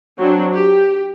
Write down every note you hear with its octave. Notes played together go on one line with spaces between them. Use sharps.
F#3 C4 D4
G4